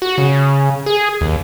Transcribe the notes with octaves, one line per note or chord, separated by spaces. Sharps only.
F#4
C#3
G#4
D#2